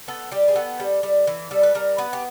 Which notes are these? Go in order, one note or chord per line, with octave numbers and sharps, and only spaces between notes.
B3 A4
G3 G4
G#4
B3 A4
G3
G3
E3
G3 A4
B4
G3 A#4
B3 B4
G4